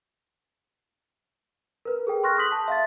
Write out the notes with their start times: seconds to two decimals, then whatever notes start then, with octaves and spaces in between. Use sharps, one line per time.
1.85 A#4 B4
2.07 G#4 A4 G5
2.23 C6 C#6 F6 F#6 A#6
2.37 C6 D#6 G6 B6 F#7
2.52 A5
2.68 E5 F5 A6